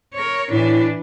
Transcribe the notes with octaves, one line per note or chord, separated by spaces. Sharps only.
A#4 C#5
A2 E3 D4